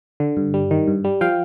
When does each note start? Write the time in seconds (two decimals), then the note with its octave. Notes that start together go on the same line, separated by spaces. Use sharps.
0.20 D3
0.37 G2
0.54 G3
0.71 D#3
0.87 G2
1.04 G3
1.21 F3 F5 G5